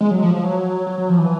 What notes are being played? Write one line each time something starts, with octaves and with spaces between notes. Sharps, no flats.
G#3
F#3
F3
F3
F#3
F#3
F#3
F3
E3